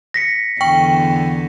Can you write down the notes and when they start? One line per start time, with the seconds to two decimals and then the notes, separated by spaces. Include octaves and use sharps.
0.14 A#6 B6 C#7
0.61 E2 D3 G5 C#6